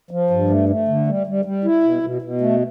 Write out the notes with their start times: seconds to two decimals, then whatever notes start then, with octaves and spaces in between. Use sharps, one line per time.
0.11 F3
0.30 G2
0.50 A3
0.69 A3
0.88 D3
1.07 G3
1.27 G3
1.45 G3
1.64 E4
1.83 B2
2.03 B2
2.22 B2
2.41 A3